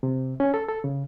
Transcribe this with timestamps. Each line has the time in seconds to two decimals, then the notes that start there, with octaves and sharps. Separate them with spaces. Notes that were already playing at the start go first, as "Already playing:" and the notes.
0.03 C3
0.40 C#4
0.54 A4
0.68 A4
0.84 C#3